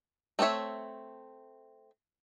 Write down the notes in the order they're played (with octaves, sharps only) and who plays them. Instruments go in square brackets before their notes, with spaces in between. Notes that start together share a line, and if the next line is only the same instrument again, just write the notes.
[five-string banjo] A3 C4 F4 C#5 E5